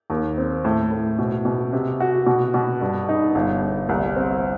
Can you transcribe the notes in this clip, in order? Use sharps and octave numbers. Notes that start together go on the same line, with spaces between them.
D#2
C4
A2
A2
B2
B2
C3
F#4
B2
B2
G2
D#4
G1
G1
C2
C4